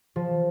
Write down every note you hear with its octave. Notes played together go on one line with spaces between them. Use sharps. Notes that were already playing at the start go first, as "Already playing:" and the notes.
F3